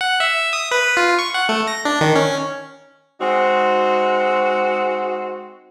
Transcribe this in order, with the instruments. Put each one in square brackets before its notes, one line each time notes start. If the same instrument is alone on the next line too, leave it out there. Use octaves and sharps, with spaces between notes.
[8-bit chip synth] F#5
E5
D#6
B4
F4
C#6
F#5
A3
A#6
D4
D#3
C#4
[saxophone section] G#3 C4 D#4 F#4